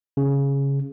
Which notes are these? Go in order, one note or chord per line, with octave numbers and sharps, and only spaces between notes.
C#3